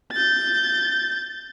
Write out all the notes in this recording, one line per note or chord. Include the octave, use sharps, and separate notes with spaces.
G6 A6